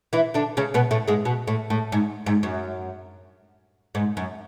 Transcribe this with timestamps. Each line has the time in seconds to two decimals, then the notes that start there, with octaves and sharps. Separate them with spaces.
0.13 E3 E4
0.34 D3 D4
0.57 C#3 C#4
0.74 B2 B3
0.91 A2 A3
1.08 G#2 G#3
1.25 B2
1.47 A2
1.70 A2
1.92 G#2
2.26 G#2
2.43 F#2
3.95 G#2
4.17 F#2